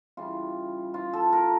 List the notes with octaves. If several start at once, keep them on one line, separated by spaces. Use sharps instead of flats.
C#3 E3 G3 F4
F4
A4
A#4